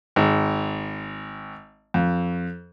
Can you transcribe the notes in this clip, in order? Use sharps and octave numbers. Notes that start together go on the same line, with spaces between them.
G#1
F2